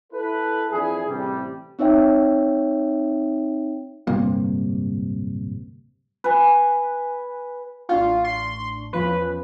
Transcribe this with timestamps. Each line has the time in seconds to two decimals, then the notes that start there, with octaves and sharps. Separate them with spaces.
0.13 E4 A4 B4
0.71 F2 E3 D4 E4 G#4
1.07 A1 C3 G3
1.79 C4 D#4 C#5 E5 G5
4.07 D1 G2 C3 A#3
6.24 B4 G#5
7.89 A1 D4 F4 C#6
8.25 C6
8.93 E2 F3 C#4 B4